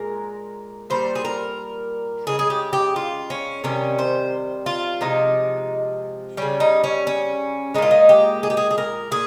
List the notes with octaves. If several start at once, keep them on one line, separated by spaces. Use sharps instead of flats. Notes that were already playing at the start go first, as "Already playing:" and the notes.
Already playing: A#2 G#3 A#4
A#2 G3 C5
G#4
A#4
C#3 G#3 G#4
G#4
G4
G4
F4
C#4
C3 D#3 G3 C#4
C5
F4
C3 F3 G#3 D#4
C#3 G3 C#4
D#4
C#4
C#4
A#2 G#3 D#4 F4
D#4
G4
G#4
G4
G#4
G#4
A#4
A#2 G#4